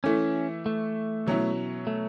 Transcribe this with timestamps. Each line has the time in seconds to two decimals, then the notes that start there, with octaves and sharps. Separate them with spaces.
0.04 E3 A3 C#4 E4
0.66 A3
1.26 B2 F#3 C#4 E4
1.87 A3